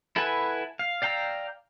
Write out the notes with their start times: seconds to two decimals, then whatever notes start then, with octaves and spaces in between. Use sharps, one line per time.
0.16 E4 A4 B4 F#5 G#5
0.79 F5
1.02 D5 F5 G5 A#5 E6